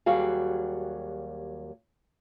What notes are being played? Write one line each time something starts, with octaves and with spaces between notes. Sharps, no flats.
D#2 F#3 G3 F#4 G#4 F5